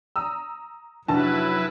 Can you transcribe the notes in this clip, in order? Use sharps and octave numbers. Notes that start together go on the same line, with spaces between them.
A#5 D#6 E6
F1 F#3 D4 E4 F#4 B4 A5